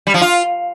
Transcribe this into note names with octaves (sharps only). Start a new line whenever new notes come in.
G3
F3
F4